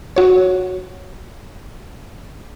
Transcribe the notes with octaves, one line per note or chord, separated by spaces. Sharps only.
F#4 C#5